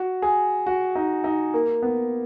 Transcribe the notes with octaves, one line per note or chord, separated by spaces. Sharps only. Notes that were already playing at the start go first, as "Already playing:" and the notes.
Already playing: F#4
G#4
F#4
D#4
D#4
A#3
B3